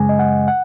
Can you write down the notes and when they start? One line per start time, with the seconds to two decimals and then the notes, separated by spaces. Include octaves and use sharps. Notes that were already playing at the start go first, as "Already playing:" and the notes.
Already playing: F#2 C#3 G#3 G#5
0.09 D#5
0.19 F#5
0.48 F#5